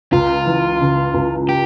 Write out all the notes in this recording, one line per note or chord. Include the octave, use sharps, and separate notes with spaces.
C#2 F4
E3
C#3
C#2
G4